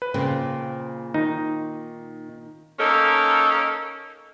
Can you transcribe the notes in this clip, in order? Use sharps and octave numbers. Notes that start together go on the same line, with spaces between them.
B4
A#2 C#3 A#3 C4
D#3 D#4
A#3 C#4 D#4 A4 A#4